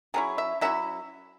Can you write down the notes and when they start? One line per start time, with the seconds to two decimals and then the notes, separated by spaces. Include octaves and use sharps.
0.14 F#3 C#4 E4 G#4
0.38 E5
0.61 F#3 C#4 E4 E5